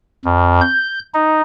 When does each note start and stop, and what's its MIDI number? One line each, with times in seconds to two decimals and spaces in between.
0.25 0.61 41
0.61 0.99 91
1.14 1.42 63